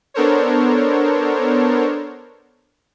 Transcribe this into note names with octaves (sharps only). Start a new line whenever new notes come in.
B3 D4 A4 A#4 C5 C#5